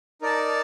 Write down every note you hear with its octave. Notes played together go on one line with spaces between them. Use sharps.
D#4 A#4 D5 A5